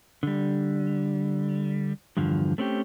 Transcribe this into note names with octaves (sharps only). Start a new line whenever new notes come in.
D3 G3
E2 G2 D3 F3
A3 C4 C#4 F#4 G4